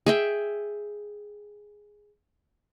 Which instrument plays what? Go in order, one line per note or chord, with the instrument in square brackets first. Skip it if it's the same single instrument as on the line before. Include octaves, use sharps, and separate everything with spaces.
[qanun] G#4 E5 G5